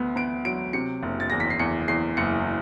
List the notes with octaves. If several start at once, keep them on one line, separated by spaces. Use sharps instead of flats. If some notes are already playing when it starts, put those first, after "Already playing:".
Already playing: D2 B3
B3 D7
F#3 D7
C3 C#7
F#1
A6
E2 A#6
B6
C7
E2 C#7
E2 C7
F#1 C#7